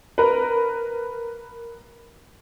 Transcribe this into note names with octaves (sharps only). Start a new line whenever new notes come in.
A#4 B4